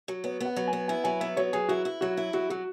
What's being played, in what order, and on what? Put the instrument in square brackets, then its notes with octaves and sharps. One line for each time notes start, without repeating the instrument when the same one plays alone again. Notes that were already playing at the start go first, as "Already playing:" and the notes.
[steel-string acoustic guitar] F#3
[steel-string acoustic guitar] B3 [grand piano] C#5
[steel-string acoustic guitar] B3 [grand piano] F#5
[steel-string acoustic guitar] F#3
[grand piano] G#5
[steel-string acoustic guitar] B3
[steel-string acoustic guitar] E4 [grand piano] G#5
[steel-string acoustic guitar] F#3 [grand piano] G#5
[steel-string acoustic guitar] B3 [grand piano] E5
[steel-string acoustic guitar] F#3 [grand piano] C#5
[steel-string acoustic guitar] F#3 [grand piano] G#4
[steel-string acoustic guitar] E4 [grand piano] F#4
[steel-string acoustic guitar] E4
[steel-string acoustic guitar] F#3 [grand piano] F#4
[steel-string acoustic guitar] E4
[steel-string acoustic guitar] F#3 [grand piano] F#4
[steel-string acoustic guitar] F#3 [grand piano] F#4